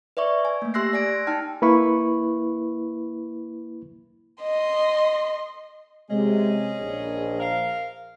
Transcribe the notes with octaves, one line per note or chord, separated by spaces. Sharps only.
B4 D5 E5 C#6
G#5
A3 A#3
G4 C6 E6 F#6 A#6 C7
D5 G#5 A#6 D7
D#4 G5 A5 F6
A#3 E4 B4 B5 C#6
D#5 C6
C3 G#3 C#4 G#4 D#5
A#1
A#4 F5